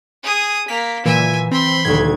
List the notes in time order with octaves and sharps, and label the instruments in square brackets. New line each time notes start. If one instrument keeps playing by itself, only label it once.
[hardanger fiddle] G#4 D#6
[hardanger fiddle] A#3 [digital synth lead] B6
[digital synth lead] A#2 [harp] E3 [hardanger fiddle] E5 G#5
[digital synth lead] C4 [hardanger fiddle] B5 C6
[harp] D#1 D2 [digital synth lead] G#6